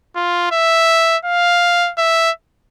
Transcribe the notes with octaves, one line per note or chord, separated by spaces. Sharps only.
F4
E5
F5
E5